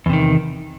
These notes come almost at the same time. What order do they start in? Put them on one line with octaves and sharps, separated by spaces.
E2 C3 D#3